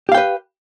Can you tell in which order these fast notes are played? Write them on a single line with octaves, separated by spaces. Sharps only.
G4 F5 G5 B4